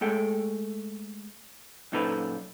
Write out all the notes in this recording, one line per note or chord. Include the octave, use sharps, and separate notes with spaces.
G#3 A3 A4 G5
F#2 A#2 D#4 A4 B4 C5